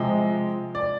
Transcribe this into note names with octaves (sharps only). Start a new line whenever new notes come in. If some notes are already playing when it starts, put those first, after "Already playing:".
Already playing: C3 F3 G#3
D5